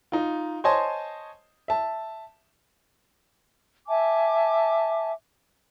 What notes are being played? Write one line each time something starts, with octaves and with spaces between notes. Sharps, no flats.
D#4 F4
C5 C#5 D#5 G#5 A5 C6
E5 A5
E5 G#5 A5 D6